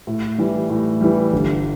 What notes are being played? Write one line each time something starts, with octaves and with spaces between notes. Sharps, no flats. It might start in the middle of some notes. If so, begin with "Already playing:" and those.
A2
E3 G3
A2
E3 G3
G1